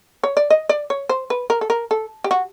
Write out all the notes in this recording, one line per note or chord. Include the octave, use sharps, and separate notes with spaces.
C#5
D5
D#5
D5
C#5
C5
B4
A#4
A4
A#4
A4
G4
F#4